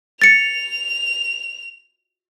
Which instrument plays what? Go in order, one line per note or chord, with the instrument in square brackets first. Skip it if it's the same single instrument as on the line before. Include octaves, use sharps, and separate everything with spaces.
[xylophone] A6 C#7 [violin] F7